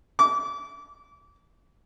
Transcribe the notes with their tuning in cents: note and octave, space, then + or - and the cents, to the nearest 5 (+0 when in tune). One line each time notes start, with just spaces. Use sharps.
D6 -30